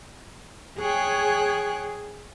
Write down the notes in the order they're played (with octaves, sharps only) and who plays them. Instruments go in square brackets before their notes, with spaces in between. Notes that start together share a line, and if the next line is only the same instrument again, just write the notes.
[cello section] G#4 [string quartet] C#5 G5 F#6